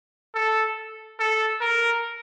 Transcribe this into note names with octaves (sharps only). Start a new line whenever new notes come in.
A4
A4
A#4